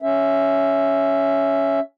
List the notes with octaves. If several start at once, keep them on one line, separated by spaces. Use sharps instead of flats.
C#4 E5